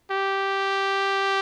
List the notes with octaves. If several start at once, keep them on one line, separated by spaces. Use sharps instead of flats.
G4